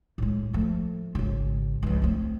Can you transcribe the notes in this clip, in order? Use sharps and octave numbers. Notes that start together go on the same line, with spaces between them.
A2 G#3
F3 A3
G#1 C#3
C#2 F3
A3 C4